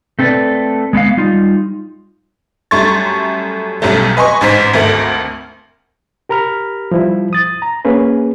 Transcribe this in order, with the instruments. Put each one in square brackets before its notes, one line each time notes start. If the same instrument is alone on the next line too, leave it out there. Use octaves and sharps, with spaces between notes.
[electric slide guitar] A3 C4 A4 B4 D5
G#3 B3 D4 F5
G3 D#4 F4
[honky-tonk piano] F#2 G3 A3 C6 C#6 A6
B1 F#2 F#3 G3 A3
B4 D#5 G#5 C6 C#6
A1 G#2 C5 B6
G#1 D2 A3 A#4
[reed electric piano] G4 A#4 A#5 B5 F6
F3 G3 E4
D#6 A6
A#5
A#3 C#4 G#4 B4